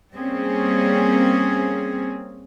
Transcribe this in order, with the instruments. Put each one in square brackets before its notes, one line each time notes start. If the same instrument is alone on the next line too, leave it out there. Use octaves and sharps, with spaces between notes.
[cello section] G3 A#3 C4 C#4 G#4